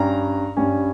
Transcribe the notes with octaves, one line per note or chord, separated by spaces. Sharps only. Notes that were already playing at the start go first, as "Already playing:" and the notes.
Already playing: G2 G3 C#4 A#5
G2 G3 C#4